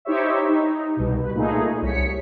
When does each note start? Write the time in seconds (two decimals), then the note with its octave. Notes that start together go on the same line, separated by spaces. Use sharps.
0.05 D#4 E4 G4 C5 C#5 E5
0.48 D#4
0.97 C2 B2
1.23 B4
1.34 A#2 A3 D#4 G#4
1.82 C2 C#5 B6 C#7